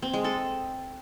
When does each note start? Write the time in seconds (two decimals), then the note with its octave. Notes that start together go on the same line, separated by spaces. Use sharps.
0.02 C4
0.13 G#3
0.24 A4